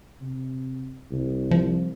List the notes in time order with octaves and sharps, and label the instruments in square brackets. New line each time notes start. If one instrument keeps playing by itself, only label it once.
[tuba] C3
C2
[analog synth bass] F3